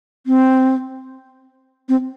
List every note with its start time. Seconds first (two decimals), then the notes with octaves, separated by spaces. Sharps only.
0.27 C4
1.89 C4